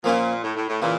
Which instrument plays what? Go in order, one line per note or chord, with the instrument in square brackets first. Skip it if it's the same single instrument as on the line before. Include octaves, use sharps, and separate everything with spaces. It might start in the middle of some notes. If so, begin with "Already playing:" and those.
[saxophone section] A#2 [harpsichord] F3 A#3 C#4 F4
[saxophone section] A2
A2
A2
[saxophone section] A#2 [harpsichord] C#3 E3